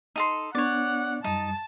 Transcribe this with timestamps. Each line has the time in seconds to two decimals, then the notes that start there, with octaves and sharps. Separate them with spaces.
0.16 D#4 A4 C6
0.55 B3 D4 C#5 D5 F#5
1.24 F#2 G3 D#4 A5